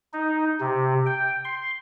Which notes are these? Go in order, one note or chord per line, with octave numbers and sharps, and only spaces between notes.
D#4
C3
G5
C6